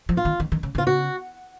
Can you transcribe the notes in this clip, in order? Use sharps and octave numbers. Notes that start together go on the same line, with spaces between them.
F3
F4
D#3
D#3
D#3
C#3
C#3 F4
F#4